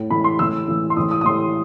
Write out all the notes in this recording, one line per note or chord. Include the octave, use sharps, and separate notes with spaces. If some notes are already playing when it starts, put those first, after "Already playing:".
Already playing: A2
A2 E3 B5
C6
A2 E3 E6
A2 E3
C6
A2 E3 D#6
D#6
D#6
A2 E3 C6